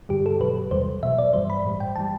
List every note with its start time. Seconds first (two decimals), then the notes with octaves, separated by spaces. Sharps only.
0.09 G2 D3 G3 G4
0.26 A4
0.40 B2 F#3 B4
0.71 E2 C3 E3 G3 C5
1.03 B2 F#3 E5
1.18 D5
1.33 G2 E3 G3 C5
1.50 B5
1.65 A2 G3
1.80 G5
1.96 E3 G3 A5